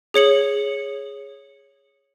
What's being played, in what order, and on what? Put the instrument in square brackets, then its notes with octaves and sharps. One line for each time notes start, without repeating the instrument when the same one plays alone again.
[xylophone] G#4 C#5 C#7 F#7